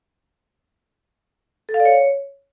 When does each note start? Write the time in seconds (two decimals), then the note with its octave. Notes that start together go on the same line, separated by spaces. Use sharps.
1.69 A4
1.74 F5
1.80 D5
1.85 C#5